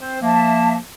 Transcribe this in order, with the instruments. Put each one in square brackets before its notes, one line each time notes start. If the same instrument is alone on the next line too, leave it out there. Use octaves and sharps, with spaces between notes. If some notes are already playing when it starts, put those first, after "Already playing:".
[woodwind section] C4 C5
[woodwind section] F3 A#3 [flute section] E5 A5